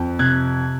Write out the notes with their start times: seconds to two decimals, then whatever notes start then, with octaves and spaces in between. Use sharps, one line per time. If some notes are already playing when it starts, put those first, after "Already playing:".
Already playing: F2
0.19 C3 F#6 G#6